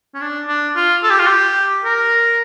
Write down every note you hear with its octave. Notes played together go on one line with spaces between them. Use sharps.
C#4
D4
D4
F4
A4
G4
F4
G4
A#4